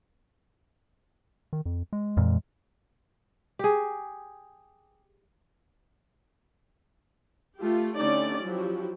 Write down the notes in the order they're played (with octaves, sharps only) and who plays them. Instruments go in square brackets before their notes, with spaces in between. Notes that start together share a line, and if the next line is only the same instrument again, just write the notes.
[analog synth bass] D#3
F2
G#3
[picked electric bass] F2 A#2 E3
[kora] G4 G#4
[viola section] A3 F4 G4
D3 A3 C#4 D#4 G4 D5
F3 F#3 E4 F#4 G4